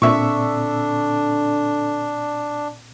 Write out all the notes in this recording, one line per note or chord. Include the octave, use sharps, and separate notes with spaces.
A#2 D3 C4 D4 E5 C#6